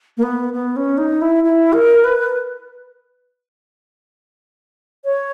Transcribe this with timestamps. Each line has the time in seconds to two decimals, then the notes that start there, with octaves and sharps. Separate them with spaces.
0.17 A#3
0.23 B3
0.53 B3
0.76 C#4
0.98 D#4
1.22 E4
1.44 E4
1.73 A#4
2.04 B4
5.05 C#5